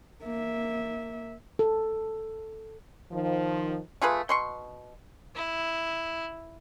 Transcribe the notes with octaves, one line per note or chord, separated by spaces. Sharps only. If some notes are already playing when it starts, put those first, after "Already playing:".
A#3 E5
A4
D#3 F3
A3 F4 G#4 B4
B2 C6 C#6
E4